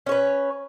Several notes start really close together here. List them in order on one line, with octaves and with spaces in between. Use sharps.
C#4 C#5 B4